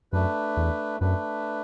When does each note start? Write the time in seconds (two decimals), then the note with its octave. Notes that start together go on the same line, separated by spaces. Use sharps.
0.12 F#2 A3 D4 B4
0.57 E2
1.01 F#2 A3 D4 B4